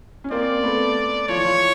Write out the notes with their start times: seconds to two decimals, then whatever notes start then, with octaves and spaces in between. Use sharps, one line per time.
0.24 C#4
0.31 A#3 C4 D5
0.63 A3 B3
1.28 F3 C#5
1.37 E3
1.45 F3